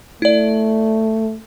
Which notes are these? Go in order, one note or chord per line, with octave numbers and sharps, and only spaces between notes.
A3 E4 D5